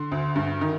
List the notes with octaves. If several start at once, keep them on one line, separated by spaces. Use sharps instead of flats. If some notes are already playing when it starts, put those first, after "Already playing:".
Already playing: D3 C6
D2
G2
D#3